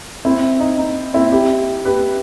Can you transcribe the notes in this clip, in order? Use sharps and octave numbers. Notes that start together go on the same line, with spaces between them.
C4 E4
D#4
D#4
C4 E4
E4 G4
G4 B4